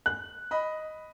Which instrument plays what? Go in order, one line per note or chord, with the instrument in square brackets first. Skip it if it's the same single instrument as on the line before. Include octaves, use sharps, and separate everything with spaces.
[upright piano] F#6
[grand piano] D#5 B5